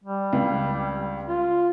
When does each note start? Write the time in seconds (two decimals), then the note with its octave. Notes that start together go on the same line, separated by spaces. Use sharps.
0.04 G3
0.33 C#2
1.28 F4